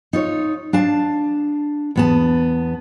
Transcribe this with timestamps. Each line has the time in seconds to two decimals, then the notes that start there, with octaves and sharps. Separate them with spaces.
0.13 D#4 F4 C#5
0.73 D4 F5 A5
1.96 E2 B3 A5